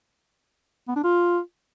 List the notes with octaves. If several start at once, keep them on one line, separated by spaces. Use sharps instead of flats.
B3
D4
F4